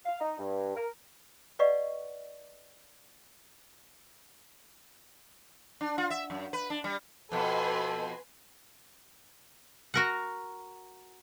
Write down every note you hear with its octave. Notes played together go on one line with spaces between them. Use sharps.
F5
D#4
G2
A#4
B4 D5 D#5 F5 F#5 C#6
D4
F4
E5
F#2
B4
D4
G3
F2 B2 A4 B4 G#5 C6
F#4 A#4 F#5